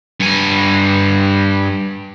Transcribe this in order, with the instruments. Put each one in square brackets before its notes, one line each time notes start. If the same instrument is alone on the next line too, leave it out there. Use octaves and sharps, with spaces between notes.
[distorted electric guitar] G2 G#5